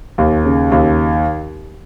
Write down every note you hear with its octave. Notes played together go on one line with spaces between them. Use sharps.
D#2
C#3
D#2